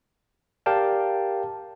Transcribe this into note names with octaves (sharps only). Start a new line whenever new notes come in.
G4 A#4 D5 F5 G5 A5